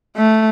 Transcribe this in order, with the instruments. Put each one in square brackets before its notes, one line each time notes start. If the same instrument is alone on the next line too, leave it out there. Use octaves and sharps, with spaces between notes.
[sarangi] A3